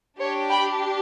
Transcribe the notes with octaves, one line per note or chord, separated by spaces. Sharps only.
D4 G4 C#5
G5 B5